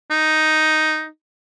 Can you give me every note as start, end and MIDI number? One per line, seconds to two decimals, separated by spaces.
0.11 1.07 63